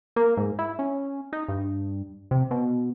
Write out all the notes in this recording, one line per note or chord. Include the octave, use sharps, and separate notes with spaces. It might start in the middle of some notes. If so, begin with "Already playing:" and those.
A#3
G#2
E4
C#4
D#4
G2
C3
B2